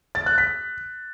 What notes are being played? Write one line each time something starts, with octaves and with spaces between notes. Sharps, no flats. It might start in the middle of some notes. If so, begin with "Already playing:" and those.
A6
F#6
B6